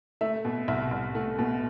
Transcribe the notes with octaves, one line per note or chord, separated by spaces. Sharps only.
A3 E5
B2
C2 E5
C2
A3
B2